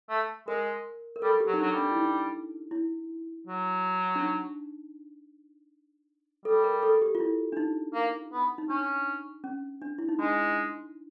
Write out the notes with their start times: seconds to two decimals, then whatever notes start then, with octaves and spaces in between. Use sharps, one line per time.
0.10 A3
0.48 G#3 A#4
1.16 A#4
1.22 G3 A4
1.40 G4
1.47 F#3
1.54 D#4
1.60 F#3 D4
1.72 G3
1.78 D4
1.91 E4
1.97 D#4
2.71 E4
3.47 F#3
4.16 D4
4.21 D#4
6.45 G3 A4
6.64 A#4
6.83 A4
7.02 G4
7.15 F4
7.20 E4
7.52 D4
7.57 D#4
7.94 A#3
8.32 B3
8.58 D#4
8.70 C#4 D4
9.44 C#4
9.82 D4
9.98 E4
10.09 D#4
10.19 G#3 D4